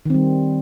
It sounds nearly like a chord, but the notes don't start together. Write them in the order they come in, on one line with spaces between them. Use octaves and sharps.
D#3 C4 G3